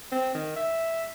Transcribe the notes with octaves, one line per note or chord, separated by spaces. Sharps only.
C4
D#3
E5